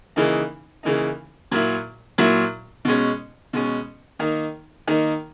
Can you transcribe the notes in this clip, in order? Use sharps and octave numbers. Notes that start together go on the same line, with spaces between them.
C#3 E3 A#3 D#4
C#3 E3 A#3 D#4
A#2 F#3 A#3 E4
A#2 F#3 A#3 E4
B2 G#3 C#4
B2 G#3 C#4
D#3 A#3 D#4
D#3 A#3 D#4